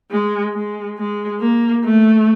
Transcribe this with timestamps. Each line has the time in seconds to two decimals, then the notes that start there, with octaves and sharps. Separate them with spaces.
0.11 G#3
0.54 G#3
0.98 G#3
1.41 A#3
1.84 A3